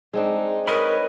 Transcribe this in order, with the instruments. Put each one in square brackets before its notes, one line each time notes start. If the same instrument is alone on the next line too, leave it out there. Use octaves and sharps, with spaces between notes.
[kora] G#3 C4 D4 [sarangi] D#4
[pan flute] A#4 [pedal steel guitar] B4 D#5 B5 [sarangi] C#5